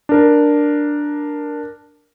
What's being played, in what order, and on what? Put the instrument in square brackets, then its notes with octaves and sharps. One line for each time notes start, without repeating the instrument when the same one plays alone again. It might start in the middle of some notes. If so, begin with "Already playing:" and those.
[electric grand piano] D4 A#4